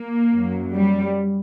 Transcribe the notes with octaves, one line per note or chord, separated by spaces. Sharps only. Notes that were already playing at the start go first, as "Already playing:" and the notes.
Already playing: A#3
F#2 F#3
G3